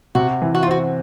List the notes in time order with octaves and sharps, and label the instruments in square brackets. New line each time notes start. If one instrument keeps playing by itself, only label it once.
[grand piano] C3 [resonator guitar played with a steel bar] F#4
[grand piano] E3
[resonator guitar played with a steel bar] F#4
F4
[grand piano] C4 [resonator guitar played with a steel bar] F#4